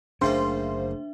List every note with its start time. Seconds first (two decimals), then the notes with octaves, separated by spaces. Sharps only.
0.21 F#1 C#3 A3 A#3 C#4 D4 C5 E5